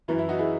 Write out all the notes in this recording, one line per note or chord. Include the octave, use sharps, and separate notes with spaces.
F#2 E3 E4
E4
D#4 F#4
E4 G#4